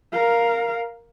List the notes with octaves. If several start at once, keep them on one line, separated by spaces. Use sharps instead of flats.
A#4 F5